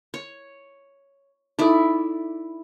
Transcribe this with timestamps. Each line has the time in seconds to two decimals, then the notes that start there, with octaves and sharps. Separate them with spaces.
0.14 C#5
1.59 D#4 E4 A4 D5